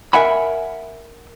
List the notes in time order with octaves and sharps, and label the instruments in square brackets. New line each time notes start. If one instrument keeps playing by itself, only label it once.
[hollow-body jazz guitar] A#4 C5 E5 F#5 G#5 B5